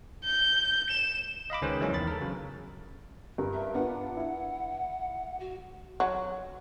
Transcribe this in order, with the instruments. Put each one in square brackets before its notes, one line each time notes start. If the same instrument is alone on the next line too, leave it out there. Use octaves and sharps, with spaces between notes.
[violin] G6
E7
[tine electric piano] D#5 F5 B5 D6
C#2 D#3 C#4 G#4 B4 C5
E3 F#3 G#3 A#3 C#4 D4
E2 D#3 B5 A6
A4 A#4
C#3 F#3
[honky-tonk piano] G2 A#4
[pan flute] E5
[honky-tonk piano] B3 D4 F4 [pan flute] F#5
[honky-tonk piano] E4
[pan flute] F#4
[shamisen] F#3